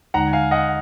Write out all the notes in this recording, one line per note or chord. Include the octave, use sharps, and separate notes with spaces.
D#2 D3 G#3 D#4 F#5 A#5
F5 G#5
D#5 F#5